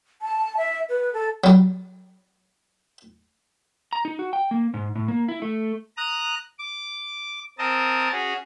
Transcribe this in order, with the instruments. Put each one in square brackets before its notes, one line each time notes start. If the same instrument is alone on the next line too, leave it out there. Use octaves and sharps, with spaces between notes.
[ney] A5
E5
B4
A4
[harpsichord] F#3 G3
[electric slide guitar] A#5
D#4
F#4
G5
A#3
G#2
A2
A#3
E4
A3
[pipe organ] A#5 D#6 F#6
D6
C4 A#4 D#5 A5
C#4 F#4 G#4